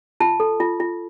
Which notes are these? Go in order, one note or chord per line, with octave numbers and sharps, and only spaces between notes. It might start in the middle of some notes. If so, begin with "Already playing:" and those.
F4 A5
A4
F4
F4